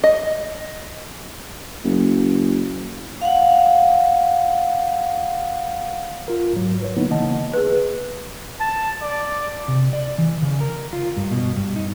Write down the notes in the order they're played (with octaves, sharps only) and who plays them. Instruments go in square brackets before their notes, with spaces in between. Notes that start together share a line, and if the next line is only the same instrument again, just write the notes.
[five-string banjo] D#5
[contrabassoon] F#1
[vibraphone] F5 F#5
[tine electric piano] F4 A#4
G#2 F#3
B4 C#5
D3 F#3 A#3 B3 D#4 E4
C#3 E3 A#3 D#5 F#5 A5
[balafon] G#4 B4
[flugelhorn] A5
D5
[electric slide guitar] C3
D5
E3
C#3
A#4
F4
G2
B2
G2
D#4